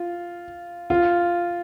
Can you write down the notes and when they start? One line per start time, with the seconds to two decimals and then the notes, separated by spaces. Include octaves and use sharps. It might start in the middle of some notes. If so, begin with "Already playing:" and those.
Already playing: F4
0.90 F4